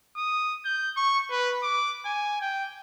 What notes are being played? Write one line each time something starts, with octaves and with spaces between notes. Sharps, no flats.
D#6
G6
C#6
B4
D6
G#5
G5